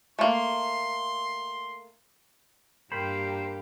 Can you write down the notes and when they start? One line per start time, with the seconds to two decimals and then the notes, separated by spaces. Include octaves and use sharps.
0.19 A3 A#3 C6
2.92 G2 A#3 G4 A#4 C5 G5 B5